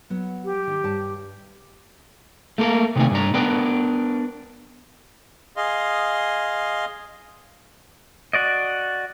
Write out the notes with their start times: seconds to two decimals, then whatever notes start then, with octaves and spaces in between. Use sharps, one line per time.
0.10 F#3 B3
0.44 G4
0.67 D#3 D#4
0.83 G2 C#5 A5
2.58 A3 A#3 A4 A#4
2.96 C3 D#3 A3 C4 G#5
3.11 G2 D4 A#5
3.34 B3 D4 A#4 B4 G5
5.57 G#4 D#5 F5 C6
8.33 F#4 D5 D#5